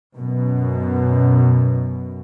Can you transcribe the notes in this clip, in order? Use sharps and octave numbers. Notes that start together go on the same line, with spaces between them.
F#2 B2